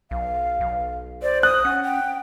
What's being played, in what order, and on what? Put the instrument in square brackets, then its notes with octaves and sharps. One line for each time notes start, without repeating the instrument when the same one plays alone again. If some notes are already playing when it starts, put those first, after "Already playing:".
[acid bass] B1 [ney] F5
[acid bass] B1
[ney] C5 [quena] D5
[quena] D#6 [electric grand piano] F#6
[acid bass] C#4 [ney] F#5
[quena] G5